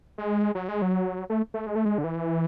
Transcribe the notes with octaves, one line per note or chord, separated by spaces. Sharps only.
G#3
F#3
G#3
F#3
A3
A3
G#3
A3
G#3
D3
E3